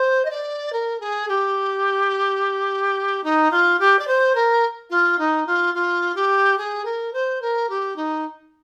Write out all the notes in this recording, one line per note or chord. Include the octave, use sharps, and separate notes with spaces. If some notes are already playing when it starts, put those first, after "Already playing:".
Already playing: C5
D#5
D5
A#4
G#4
G4
D#4
F4
G4
D5
C5
A#4
F4
D#4
F4
F4
G4
G#4
A#4
C5
A#4
G4
D#4